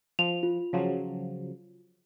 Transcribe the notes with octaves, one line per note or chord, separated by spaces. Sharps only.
F3 F7
F4
C#3 F3 F#3